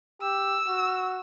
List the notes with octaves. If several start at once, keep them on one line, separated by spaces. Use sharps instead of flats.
G4 E6
F#4